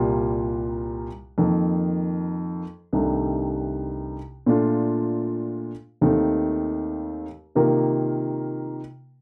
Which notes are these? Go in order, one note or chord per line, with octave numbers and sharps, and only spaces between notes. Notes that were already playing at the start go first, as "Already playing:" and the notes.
Already playing: C2 A#2 G3 A#3 F4
F2 D#3 A#3
C2 C3 D#3 A3 D4
A#2 A3 D4 F4
D#2 D#3 A3 C4
C3 D#3 A#3 F4 A#4